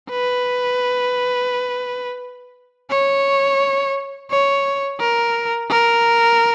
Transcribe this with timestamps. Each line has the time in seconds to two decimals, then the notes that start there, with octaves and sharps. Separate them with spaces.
0.10 B4
2.90 C#5
4.30 C#5
5.00 A#4
5.70 A#4